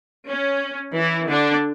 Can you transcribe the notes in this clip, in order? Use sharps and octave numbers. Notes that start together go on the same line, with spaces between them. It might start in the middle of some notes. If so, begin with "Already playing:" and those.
C#4
E3 E4
D3 D4